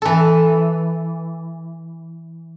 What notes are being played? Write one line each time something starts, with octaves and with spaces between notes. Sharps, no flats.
E3 A4